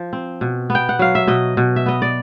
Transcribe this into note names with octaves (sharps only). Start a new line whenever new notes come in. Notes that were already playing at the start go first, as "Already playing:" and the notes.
Already playing: F3
C4
B2
B3
G5
F#5
F#3 F5
E5
B2 D#5
B2
E5
B3 D#5
D5